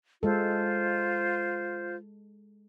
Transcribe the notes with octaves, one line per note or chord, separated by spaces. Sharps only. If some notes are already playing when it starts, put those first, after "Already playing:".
G#3 F4 A4 C5